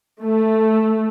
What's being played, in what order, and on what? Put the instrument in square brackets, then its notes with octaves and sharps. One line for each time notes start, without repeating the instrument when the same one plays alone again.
[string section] A3